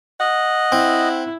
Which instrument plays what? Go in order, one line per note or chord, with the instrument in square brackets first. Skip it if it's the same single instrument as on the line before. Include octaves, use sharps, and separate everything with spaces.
[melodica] D#5 [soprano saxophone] F#5
[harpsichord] C4 [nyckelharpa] E4